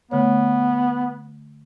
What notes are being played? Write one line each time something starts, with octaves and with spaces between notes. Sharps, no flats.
D3 A3 B3 C#5